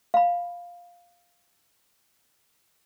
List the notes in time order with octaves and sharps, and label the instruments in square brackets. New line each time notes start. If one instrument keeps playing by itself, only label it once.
[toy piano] F5 B5